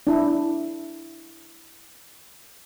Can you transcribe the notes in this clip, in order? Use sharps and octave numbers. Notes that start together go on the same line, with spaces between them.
D4 E4